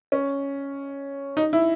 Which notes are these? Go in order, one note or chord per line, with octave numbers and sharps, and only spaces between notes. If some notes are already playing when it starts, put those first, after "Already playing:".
C#4
D#4
E4